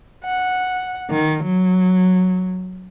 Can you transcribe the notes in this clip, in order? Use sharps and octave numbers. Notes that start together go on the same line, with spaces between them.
F#5
D#3
F#3